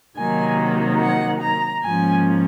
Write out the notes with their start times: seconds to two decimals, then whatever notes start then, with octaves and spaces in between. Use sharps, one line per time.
0.17 C3 D#3 F#3 A#3 D#4 G#5
1.01 F#5
1.42 A#5
1.84 G#2 F3 A#3 C#4 G#5